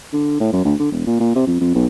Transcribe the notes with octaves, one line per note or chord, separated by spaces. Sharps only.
D3
A2
F#2
D2
D3
E1
A#2
A#2
C3
F2
F2
B1